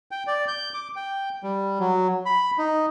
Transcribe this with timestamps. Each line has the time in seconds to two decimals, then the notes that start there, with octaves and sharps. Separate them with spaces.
0.11 G5
0.27 D5
0.48 G6
0.74 D6
0.96 G5
1.43 G3
1.79 F#3
2.26 B5
2.58 D#4